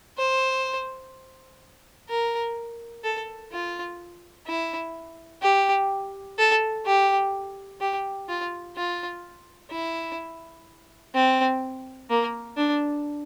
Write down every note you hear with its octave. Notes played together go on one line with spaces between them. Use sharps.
C5
A#4
A4
F4
E4
G4
A4
G4
G4
F4
F4
E4
C4
A#3
D4